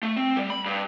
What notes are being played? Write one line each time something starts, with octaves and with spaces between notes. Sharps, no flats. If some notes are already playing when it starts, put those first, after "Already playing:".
A3
C4
G3
B5
G2